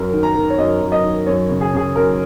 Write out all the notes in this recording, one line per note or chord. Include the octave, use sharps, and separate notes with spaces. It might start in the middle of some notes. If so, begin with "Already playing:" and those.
Already playing: F#2 A#4
D#3
A#5
D#3
C#5
F#2 D#5
F#2
D#5
D#3
F#2 C#5
C#3
G#4
C#3 G#4
F#2 A#4